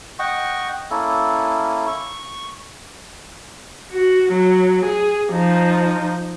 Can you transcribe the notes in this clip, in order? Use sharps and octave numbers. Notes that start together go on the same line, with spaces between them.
D#5 F#5 G5 C#6
A#3 C#4 E4 A4
C#6
F#4
F#3
G#4
F3 D#4